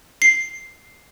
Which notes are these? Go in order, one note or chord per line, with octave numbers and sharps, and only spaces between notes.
C7